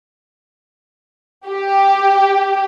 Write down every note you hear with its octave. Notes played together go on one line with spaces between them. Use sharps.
G4